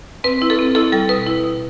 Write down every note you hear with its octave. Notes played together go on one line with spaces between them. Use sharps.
C4 B4
E4
A4
C4
E4 A4
G3 A4
B2 B4
E4
B2